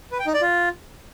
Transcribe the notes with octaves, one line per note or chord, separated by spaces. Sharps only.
B4
G5
D#4
D5
F4